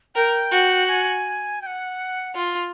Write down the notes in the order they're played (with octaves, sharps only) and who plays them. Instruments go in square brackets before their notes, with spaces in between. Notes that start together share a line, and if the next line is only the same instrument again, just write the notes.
[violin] A#4 [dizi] G5
[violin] F#4
[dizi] G#5
G5
F#5
[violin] F4